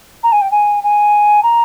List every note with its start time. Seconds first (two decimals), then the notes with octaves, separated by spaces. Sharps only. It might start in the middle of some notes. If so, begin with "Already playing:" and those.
0.23 A#5
0.32 G#5
0.41 G5
0.51 G#5
0.83 G#5
1.43 A#5